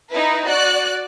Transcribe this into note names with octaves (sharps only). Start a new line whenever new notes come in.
D#4 E4 B4
F#4 D5 F#6